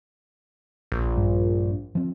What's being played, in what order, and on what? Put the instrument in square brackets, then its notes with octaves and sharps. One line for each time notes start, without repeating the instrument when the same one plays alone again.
[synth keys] A#1
[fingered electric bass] G2
F3 C4